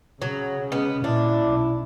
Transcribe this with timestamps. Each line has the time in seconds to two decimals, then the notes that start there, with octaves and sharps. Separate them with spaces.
0.22 C#3 F#3
0.72 G#3 B3 C#4 D#5
1.04 A#2 D4 E4
1.46 B1